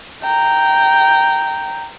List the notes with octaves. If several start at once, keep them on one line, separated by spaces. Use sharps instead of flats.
G5 A#5